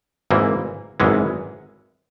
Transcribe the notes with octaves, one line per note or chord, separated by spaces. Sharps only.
G#1 G#2 E3 A#3
G#1 F#2 E3 G#3 C#4